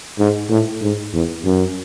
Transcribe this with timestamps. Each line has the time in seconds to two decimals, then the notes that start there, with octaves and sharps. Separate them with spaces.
0.19 G#2
0.50 A2
0.82 G#2
1.14 E2
1.45 F#2